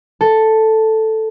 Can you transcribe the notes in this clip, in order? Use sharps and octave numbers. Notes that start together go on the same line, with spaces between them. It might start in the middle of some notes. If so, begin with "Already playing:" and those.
A4